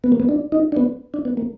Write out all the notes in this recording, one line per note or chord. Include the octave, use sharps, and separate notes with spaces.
B3
A#3
B3
D4
D#4
D4
B3
D4
B3
A#3